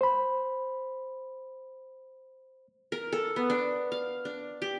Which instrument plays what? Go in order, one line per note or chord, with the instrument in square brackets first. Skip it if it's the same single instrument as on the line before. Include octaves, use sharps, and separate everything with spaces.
[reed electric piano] C5 B5
[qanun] A#4
A4
B3
D4
F5
D4
G4